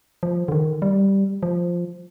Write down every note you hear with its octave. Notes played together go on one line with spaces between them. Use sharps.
F3
D3
D#3
G3
F3